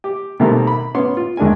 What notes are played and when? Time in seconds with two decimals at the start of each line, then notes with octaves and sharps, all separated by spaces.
0.04 G4
0.40 B2 D#3 G3 A3 A#3 C4
0.67 B5
0.95 B3 C#4 C6
1.17 F4
1.37 D#2 G#3 D4 A#4 G#5